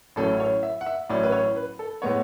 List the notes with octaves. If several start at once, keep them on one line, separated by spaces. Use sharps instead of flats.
A1 A2 F#3 C#4 E4 A4
C#5
E5
F#5
E5
A1 A2 F#3 C#4 E4 D5
B4
C#5
B4
A4
A2 G#3 B3 C#5